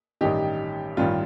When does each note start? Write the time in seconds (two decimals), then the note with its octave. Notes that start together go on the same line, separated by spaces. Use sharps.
0.21 A1 G2 D#3 D#4 G4
0.97 A1 G2 D#3 G3 F4